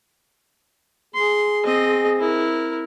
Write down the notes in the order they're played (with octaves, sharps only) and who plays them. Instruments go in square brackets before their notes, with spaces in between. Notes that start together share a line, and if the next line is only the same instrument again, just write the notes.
[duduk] G#4 [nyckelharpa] C6
[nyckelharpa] C4 D#5
E4 A#4